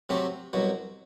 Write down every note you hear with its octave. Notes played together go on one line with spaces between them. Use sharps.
C3 F#3 A3 C4 G4
C2 B2 F#3